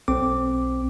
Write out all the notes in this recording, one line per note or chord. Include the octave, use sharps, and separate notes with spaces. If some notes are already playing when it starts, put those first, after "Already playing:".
B1 C4 D6